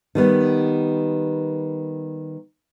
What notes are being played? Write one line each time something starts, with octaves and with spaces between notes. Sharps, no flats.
D#3 G3 B3